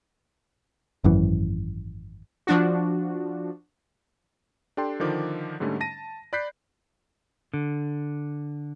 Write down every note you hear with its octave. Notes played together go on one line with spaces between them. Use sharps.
G#1 F#2 E3
F3 D4 F#4
D4 G4 A4 G5 C6
D3 D#3 F3 D6
G#2 D3 G3 A3 C#4
A5 A#6 D#7
D5 B5 F#6 G6 B6 C7
D3